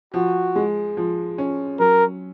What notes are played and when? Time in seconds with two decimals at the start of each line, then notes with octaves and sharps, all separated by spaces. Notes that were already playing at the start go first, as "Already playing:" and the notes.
0.14 F3 F#4
0.56 G#3
0.97 F3
1.38 C#4
1.80 F#3 A#4